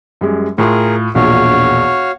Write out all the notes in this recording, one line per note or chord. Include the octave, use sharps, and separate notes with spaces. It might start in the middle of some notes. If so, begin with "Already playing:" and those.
F#2 G3 G#3
A2 F4 G#4 A#4 C6
E1 A#1 A#2 F#4 C#5 F5